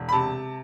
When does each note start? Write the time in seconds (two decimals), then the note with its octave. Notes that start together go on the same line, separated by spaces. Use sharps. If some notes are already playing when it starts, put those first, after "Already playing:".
Already playing: E1
0.09 B5
0.12 C3 A5